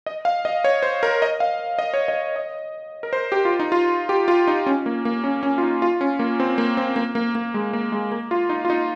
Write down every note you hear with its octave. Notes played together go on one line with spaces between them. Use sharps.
D#5
F5
D#5
C#5
C5
A#4
D#5
F5
D#5
C#5
D#5
D#5
A#4
C5
G4
F4
D#4
F4
G4
F4
D#4
C#4
A#3
A#3
C#4
C#4
F4
D#4
F4
C#4
A#3
C4
A#3
C4
A#3
A#3
A#3
G#3
A#3
G#3
A#3
F4
D#4
F4
D#4